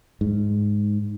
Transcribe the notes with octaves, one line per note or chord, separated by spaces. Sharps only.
G#2